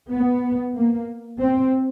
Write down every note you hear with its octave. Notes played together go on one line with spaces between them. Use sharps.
B3
A#3
C4